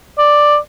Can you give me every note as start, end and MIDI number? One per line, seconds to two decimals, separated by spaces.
0.18 0.58 74